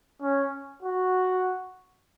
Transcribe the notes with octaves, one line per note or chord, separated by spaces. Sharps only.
C#4
F#4